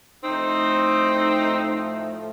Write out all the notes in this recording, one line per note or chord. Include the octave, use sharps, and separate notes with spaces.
A2 F3 A3 C4 D#4